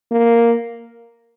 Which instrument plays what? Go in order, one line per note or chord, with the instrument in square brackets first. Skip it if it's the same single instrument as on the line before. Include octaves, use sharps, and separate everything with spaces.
[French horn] A#3